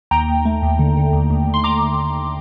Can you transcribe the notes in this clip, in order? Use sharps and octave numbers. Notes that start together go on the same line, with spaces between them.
D#2 G5 A#5
D#2
A3
D#2
D3
D3
D#2
D#2
D#2
C6
A#5 D6